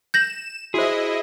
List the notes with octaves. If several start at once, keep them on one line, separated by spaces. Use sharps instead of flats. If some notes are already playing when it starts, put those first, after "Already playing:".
G6 A#6 E7 F#7
E4 F#4 G#4 C5 D#5